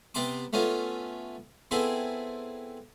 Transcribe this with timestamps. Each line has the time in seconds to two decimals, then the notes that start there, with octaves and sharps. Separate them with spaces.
0.15 C3 B3 A5 C6 D6
0.53 A3 B3 C#4 F4
1.71 B3 C4 E4 G#4 A4